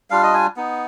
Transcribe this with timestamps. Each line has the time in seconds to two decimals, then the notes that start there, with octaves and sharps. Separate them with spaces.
0.10 G3 D4 F4 F5
0.23 D#5
0.34 G#5
0.57 B3 D#4